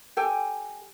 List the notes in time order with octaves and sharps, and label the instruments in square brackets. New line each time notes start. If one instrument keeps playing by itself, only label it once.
[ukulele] G4 A4 G5 G#5